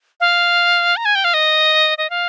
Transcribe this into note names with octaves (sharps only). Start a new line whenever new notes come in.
F5
A#5
G#5
G5
F5
D#5
D#5
F5